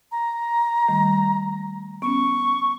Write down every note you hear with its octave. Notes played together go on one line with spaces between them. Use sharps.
A#5
D#3 G3 A3
B3 C#4 C#6